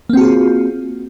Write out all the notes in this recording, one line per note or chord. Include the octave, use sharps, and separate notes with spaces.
A#3 C4 F4 F#4 G#4